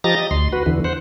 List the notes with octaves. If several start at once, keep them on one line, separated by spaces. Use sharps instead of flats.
F3 G4 D#5 A#5 A6 A#6
D#5
D2 C6
F#4 B4
E2 D3 E3
C5 F#5